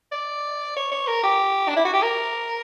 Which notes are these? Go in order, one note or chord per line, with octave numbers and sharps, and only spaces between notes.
D5
C#5
C#5
A#4
G4
D4
E4
F#4
G4
A#4